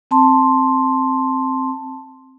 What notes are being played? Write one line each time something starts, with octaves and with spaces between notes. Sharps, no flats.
C4 A5 C6